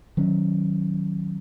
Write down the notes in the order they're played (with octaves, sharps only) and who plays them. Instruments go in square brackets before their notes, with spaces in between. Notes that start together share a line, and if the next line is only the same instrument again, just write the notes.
[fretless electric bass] D#3 F#3 C#4